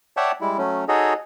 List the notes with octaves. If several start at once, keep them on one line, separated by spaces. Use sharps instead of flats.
C#5 D5 E5 F#5 G5 A5
G3 G#3 E4
F#3 A3 C#4
D#4 F#4 G#4 A4 C#5 D#5